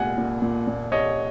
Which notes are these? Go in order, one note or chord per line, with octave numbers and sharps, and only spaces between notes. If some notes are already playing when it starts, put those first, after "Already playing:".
Already playing: C2 A#2 G#3 F#5 G#5
A#2
A#2
A#2
C2 C#5 D#5